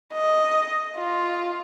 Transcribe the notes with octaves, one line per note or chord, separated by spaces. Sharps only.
D#5
F4